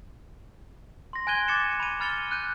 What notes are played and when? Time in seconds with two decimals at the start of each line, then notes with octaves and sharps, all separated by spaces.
1.13 C6 A#6
1.27 G#5 F#6 G#6 D#7 G7
1.48 D6 A6 C#7 E7
1.80 B5 D#7
2.00 B5 F6 A6 C#7 G7
2.31 F#6 G6 D#7